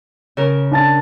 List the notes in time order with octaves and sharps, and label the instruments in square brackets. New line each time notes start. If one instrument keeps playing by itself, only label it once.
[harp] C#3 A#4
[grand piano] D4 A5 A6